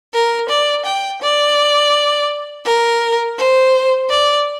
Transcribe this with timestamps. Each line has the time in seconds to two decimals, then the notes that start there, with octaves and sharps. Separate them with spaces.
0.14 A#4
0.49 D5
0.85 G5
1.22 D5
2.65 A#4
3.38 C5
4.10 D5